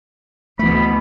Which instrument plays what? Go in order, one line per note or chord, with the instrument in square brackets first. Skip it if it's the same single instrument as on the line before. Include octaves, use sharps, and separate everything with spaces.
[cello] D2 B2 [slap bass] E3 A3 [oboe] B5